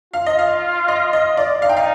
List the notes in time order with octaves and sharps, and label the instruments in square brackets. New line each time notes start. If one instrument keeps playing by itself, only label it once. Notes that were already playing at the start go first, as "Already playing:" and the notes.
[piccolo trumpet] F4 [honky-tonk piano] F5
[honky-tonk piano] D#5
F5
D#5
D#5
D5
[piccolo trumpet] D#4 [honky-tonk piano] F5
[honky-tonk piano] G5
F5